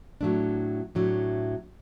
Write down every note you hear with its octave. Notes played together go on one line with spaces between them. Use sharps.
A2 F#3 A3 D4
A2 F#3 A3 D4